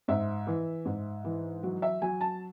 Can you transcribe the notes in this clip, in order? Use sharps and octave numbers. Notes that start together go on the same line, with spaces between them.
G#2 E5
E3
G#2
E3
F#3
E5
F#3 G#5
A5